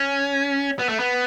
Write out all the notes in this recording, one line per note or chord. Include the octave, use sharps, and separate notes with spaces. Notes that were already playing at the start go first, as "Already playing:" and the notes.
Already playing: C#4
B3
A3
B3